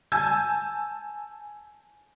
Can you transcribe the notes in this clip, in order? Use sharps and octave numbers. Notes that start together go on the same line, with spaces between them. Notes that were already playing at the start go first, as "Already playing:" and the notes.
G#5 A5 E6 G6 G#6